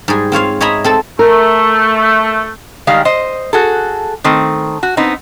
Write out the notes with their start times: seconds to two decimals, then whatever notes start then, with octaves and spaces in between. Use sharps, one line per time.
0.08 G#2 G3 G#4
0.32 C4 F4 C#5 F5
0.61 C#5 D#5 E5 G#5 A#5 B5
0.84 C4 A4 A5
1.19 A3 A#4
2.87 D#3 G3 G#3 F5
3.05 C5 D#5
3.53 F#4 G#4 A4
4.24 D#3 A3 C4
4.83 F#4
4.97 B3 C4 D#4